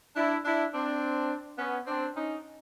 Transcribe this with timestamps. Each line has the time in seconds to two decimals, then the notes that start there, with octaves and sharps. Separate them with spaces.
0.16 D4 E4
0.45 D4 E4
0.74 C4 D4
1.59 B3 C#4
1.87 C4 D4
2.16 C#4 D#4